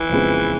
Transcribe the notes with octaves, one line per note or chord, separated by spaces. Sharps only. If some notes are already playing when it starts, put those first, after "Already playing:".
Already playing: E3
F2 C#3 F3 G#3 B3